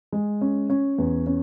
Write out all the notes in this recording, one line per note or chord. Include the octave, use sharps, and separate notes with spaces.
G#3
C#4
C#4
E2
C#4